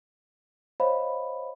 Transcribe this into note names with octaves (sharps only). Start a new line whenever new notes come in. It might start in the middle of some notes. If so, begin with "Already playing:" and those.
C5 C#5 D#5 F5 B5